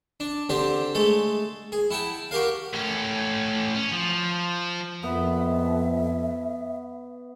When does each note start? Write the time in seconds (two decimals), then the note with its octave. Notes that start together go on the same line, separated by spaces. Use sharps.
0.20 D4
0.49 D3 C4 D4 G4
0.95 G#3 A3 A4
1.72 G#4
1.91 E4 F#5 G5 A5
2.31 F#4 G4 A#4 F5
2.73 A2 C#4
3.75 C#4
3.92 F3
5.03 F2 B3 E5